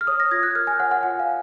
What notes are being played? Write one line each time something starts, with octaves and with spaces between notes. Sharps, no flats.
F6
C#5 D#6
A#6
F4 G#6
F#6
A#4 F6
G#5
C#5 F#5
F#5
F4 G#5
F5